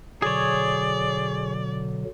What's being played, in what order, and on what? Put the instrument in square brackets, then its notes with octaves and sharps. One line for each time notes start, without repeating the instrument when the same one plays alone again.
[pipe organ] B2 D3 F#3 [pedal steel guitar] G#4 C#5 [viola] D5